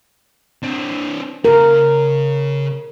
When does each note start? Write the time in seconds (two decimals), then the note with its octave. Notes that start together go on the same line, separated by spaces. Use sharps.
0.63 C4 D4
1.45 C#3 A#4